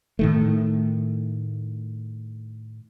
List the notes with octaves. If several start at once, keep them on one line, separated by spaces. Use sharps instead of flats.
A2 D#3 A3